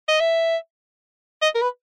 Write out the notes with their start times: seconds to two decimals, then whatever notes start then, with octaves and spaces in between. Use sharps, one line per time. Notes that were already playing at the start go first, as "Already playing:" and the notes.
0.09 D#5
0.20 E5
1.42 D#5
1.55 A#4
1.62 B4